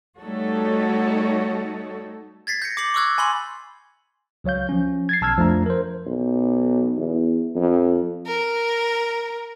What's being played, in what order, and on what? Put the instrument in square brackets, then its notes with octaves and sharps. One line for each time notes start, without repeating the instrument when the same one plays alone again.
[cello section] G3 A3 D#4 F#4 A4 C#5
[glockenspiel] G#6 A6 B6 C7
G6 A#6 C#7
D6 A6 C7 F#7
C#6 D6 E6 F#6 G#6
G#5 B5 C6 F#7
[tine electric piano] C#2 F#3 C#5 F5 G6
F3 C#4
G#6 A6 C7
B1 A5 E6 F6 G#6
F2 F3 A3 D4 A#5
A#4 C5
[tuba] B1
E2
F2
[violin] A#4